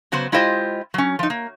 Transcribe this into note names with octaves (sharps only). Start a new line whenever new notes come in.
C#3 F#3 B3 C5
G#3 E4 F4 G4 C5 D#5
F#3 C#4
F3 D#4
A#3